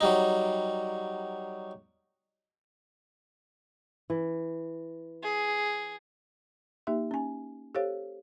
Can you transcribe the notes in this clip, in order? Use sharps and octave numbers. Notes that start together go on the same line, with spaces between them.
F#3 G3 D#4
E3
G#4
A#3 D#4 G4 E5
C#4 G#5
G4 A4 C5 C#5 F5